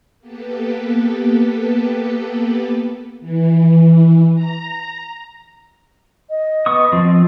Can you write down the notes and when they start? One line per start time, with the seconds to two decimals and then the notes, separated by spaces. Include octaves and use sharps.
0.19 A#3 B3 G4 A4 B4
3.21 E3
4.34 A#5
6.30 D#5
6.66 B3 C#6 D#6
6.92 F3 C4